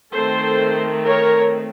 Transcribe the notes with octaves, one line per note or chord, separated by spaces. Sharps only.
D#3 A3 C4 A4 C5
A#4 C#5